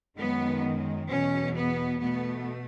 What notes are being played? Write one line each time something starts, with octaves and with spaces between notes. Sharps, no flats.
F#2 D#3 G#3 B3
E2 B2 F#3 C#4
B3
B2 A3 B3